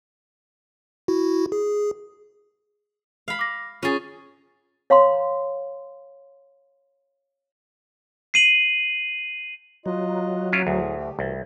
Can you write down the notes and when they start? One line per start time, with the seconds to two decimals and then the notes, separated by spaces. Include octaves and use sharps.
1.08 E4 F#4
1.52 G#4
3.28 F5 B5
3.39 D6 A#6
3.83 C#4 F4 G#4 A6
4.90 C#5 F5 A#5 C6
8.34 C7 D#7 F#7
9.86 F#3 F4 D#5
10.52 C#4 E4 F4
10.67 D2 A2 G#4
10.96 A3 G4
11.19 C2 B2 E3 A3